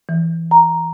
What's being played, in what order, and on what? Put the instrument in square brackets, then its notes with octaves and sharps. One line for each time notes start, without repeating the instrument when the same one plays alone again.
[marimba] E3
A#5